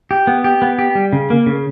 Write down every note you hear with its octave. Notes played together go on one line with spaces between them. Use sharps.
G4
B3
G4
B3
G4
G3
C#3
A#3
C#3